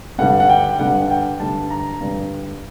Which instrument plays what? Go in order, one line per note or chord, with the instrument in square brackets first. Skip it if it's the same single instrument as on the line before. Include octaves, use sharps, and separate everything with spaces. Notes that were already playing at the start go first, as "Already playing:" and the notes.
[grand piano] G2 D3 G3 F#5
F#5
G5
G5
G2 D3 G3 F#5
F#5
G5
G2 D3 G3 A5
A#5
G2 D3 G3